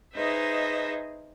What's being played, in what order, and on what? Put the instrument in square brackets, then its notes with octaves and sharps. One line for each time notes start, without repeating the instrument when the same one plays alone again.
[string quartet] D#4 G#4 B4 C5 D#5 E5